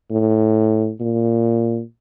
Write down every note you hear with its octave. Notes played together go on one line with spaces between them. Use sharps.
A2
A#2